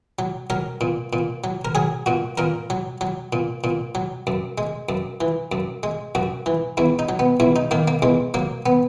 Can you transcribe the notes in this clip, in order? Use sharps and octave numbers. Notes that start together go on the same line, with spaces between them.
F#3
F#3 A#4
A#2
A#2
F#3
A#4
F#3 G#4
A#2 F#4
A#2 A#4
F#3
F#3
A#2
A#2
F#3
F#2
G#3
F#2
E3
F#2
G#3
F#2 F#4
E3
E2 E4
D#4
F#3
B3
E2 E4
D#4
D#3 A#3
A#3
E2 G#3
F#3 A#3
B3